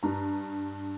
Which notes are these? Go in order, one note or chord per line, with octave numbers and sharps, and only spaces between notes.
G2 A#5